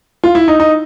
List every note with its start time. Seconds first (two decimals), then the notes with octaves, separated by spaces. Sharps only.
0.24 F4
0.35 E4
0.48 D#4
0.60 D#4